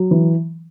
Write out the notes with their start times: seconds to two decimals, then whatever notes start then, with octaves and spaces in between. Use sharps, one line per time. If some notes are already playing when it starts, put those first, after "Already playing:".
Already playing: F#3
0.11 E3